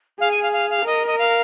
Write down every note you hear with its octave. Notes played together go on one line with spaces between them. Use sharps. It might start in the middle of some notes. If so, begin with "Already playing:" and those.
G#4 F5
G#5
F5
F5
F5
A#4 D#5
D#5
F5